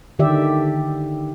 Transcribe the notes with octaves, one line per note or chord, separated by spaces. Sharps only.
D3 D#3 G4 D5 E5